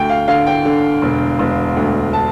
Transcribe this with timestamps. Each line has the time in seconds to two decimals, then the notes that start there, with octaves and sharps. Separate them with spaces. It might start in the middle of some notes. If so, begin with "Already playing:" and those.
Already playing: D2 G5
0.10 F5
0.28 D3 F5
0.47 G5
0.65 D3
1.02 E1
1.39 E1
1.76 D2
2.13 A5